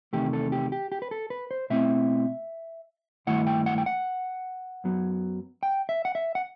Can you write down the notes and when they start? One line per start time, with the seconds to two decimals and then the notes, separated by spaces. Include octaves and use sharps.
0.13 E2 C3 D#3 A3 G4
0.33 A4
0.52 G4
0.72 G4
0.92 G4
1.02 B4
1.11 A4
1.30 B4
1.51 C5
1.70 B2 A3 C4 E4 E5
3.27 G2 D#3 A3 E4 F#5
3.47 G5
3.66 F#5
3.78 G5
3.86 F#5
4.84 F#2 F#3 B3
5.63 G5
5.89 E5
6.05 F#5
6.15 E5
6.35 F#5